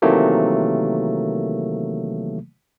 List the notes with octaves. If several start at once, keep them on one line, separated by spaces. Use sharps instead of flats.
C3 D#3 E3 F#3 A3 A#3